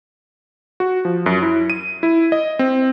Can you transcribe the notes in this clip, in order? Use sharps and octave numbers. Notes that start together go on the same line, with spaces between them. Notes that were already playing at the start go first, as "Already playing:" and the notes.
F#4
F3
F#2
E4
D#7
E4
D#5
C4